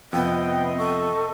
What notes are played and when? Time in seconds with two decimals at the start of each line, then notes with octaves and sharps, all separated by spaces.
0.13 F2 C3 B3 D#5 G5
0.78 A4 C#6